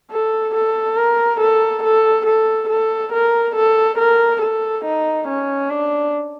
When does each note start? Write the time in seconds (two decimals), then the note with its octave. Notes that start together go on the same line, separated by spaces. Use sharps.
0.12 A4
0.55 A4
0.97 A#4
1.41 A4
1.83 A4
2.26 A4
2.69 A4
3.13 A#4
3.56 A4
3.99 A#4
4.42 A4
4.85 D#4
5.28 C#4
5.70 D4